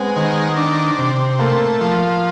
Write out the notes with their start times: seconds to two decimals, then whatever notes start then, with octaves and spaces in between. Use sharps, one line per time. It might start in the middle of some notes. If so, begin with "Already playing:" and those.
Already playing: G#3 B3 C4
0.16 D#3
0.57 D4
0.98 C3
1.39 A3 A#3
1.81 F3